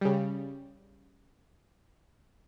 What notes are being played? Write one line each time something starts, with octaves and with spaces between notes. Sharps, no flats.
C#3 G3